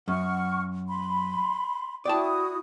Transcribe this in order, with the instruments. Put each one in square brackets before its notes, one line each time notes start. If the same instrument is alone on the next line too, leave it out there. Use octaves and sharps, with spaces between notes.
[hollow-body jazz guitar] F#2 [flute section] F#5 C#6 F6
[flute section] B5 C6
[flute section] E4 F#4 D#6 [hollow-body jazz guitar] D5 G5 A5